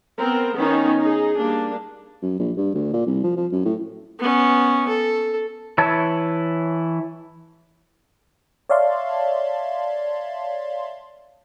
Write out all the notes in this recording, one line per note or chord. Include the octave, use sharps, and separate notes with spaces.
B3 C4 A#4
D#3 B3 C#4 D#4
D#4 G#4
G3 A#3 D4
F#2
A#1
G2
D2
A#2
C2
F3
F3
F#2
A2
B3 C#4
A4
E3 E4 C#5 A5
C#5 D5 E5 F5 A5 C6